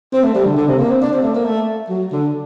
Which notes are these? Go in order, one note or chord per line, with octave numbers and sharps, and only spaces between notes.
C4
A3
G3
D3
D3
C3
A#3
C4
D4
C4
A3
A#3
A3
F#3
D3